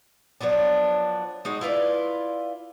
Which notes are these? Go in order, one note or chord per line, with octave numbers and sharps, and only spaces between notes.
F3 F#3 B3 D4
G#3 D#4 F#4
E4 F4 B4 D5